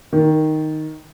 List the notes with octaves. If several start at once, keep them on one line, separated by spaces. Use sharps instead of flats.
D#3